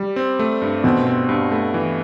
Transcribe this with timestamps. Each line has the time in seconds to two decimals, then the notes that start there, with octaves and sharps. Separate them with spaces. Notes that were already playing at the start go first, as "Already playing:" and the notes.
Already playing: G3
0.16 C4
0.39 A3
0.62 G2
0.84 B2 C4
1.07 C4
1.29 G2
1.51 A3
1.74 E3